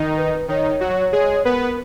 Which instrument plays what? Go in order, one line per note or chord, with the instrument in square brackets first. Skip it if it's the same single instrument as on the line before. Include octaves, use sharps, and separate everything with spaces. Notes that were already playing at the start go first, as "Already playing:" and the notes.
Already playing: [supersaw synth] D#3 D#4
[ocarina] B4
[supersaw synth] D#3 D#4 [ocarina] C#5
[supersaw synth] F#3 F#4
G#3 G#4
[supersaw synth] B3 B4 [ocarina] A#4